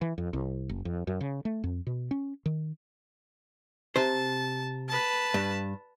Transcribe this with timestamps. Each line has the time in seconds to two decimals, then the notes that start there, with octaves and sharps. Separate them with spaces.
0.01 E3
0.18 F2
0.33 C2
0.69 F#1
0.85 F2
1.07 F#2
1.21 C#3
1.45 A3
1.64 F2
1.87 B2
2.11 C#4
2.46 D#3
3.96 C3 C5 A5
4.88 B4 A5
5.34 G2